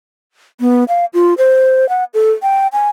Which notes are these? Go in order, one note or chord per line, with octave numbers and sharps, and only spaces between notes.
B3
F5
F4
C5
F#5
A4
G5
G#5